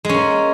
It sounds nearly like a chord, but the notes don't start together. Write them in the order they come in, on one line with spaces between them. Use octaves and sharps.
G#3 C#4 A#3